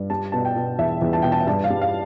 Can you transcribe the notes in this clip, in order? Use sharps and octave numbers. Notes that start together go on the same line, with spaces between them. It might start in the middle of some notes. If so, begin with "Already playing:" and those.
Already playing: G2
G3 A5
B2 A5
G5
B2
E2 E5
E2
A5
B2 G5
A5
G2 A5
F5
G3
F5